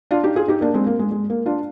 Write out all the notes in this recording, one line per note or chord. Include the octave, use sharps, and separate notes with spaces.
D4 F4
D#4 G4
F4 G#4
D#4 G4
A#3 D4
G#3 C4
A#3
G#3
G#3
A#3
D4 F4